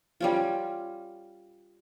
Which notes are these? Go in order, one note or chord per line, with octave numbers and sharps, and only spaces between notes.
G3 C#4 F4